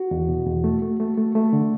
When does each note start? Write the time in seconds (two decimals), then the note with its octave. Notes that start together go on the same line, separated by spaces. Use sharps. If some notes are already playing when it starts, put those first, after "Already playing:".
Already playing: F#4
0.11 E2
0.29 B2
0.47 E2
0.64 A3
0.82 A3
1.00 A3
1.17 A3
1.35 A3
1.53 D3